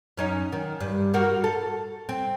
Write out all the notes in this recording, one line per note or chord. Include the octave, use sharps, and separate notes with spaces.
F#2 C#4 D#4
D#3
G2
G3 A#3 F#4
A4
C4